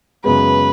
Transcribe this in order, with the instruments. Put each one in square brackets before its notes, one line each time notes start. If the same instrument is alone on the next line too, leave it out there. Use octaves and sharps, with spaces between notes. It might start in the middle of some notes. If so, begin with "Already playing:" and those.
[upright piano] F#2 C#3 G#3 B3 [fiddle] B4